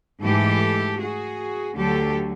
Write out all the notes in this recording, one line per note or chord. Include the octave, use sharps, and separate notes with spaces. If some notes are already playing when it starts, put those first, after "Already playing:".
G#2 E3 A3 G4 A4
F#4 G#4
D2 D3 F#3 G4 A4